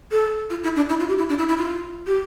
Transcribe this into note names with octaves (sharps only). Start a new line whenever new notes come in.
A4
F4
E4
D4
E4
F4
G4
E4
D4
E4
E4
F4
G4